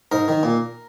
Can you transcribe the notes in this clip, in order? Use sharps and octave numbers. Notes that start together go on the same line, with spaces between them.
G#2 A#4
D#3
A#2